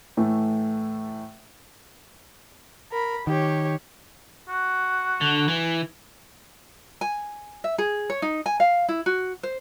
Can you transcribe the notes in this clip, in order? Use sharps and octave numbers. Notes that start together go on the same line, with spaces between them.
A2 E3 A3
A#4 B5
D#3 G4 C#5
F#4
D3
E3
G#5
E5
G#4
C#5
D#4
G#5
F5
E4
F#4
C5